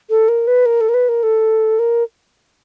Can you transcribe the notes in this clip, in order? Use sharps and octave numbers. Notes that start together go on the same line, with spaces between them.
A4
A#4
B4
A#4
A4
A#4
B4
A#4
A4
A#4